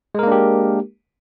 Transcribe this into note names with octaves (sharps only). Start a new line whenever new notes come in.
G#3 A#3 D4 G4 A#4